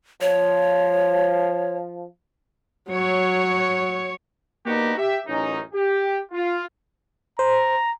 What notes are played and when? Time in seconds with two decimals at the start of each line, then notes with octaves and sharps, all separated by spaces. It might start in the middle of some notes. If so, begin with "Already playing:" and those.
0.21 F3 C#5
2.90 F#3 C#5
4.66 A#3 B3 D4 D#4 F#4 G4
4.98 G4 E5
5.27 A1 F#2 C#4 D#4
5.73 G4
6.32 F4
7.39 C5 A#5